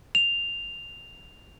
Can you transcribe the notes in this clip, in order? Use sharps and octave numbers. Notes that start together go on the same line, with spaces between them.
F7